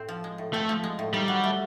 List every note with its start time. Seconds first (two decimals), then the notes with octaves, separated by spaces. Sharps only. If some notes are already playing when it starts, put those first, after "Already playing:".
Already playing: A2 C4
0.09 F3
0.24 G#3
0.38 A2
0.53 A3 C4
0.69 F3
0.84 G#3
0.99 A2
1.13 D#3 G3
1.28 F#3
1.44 A3